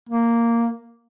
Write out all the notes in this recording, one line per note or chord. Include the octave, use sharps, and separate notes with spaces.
A#3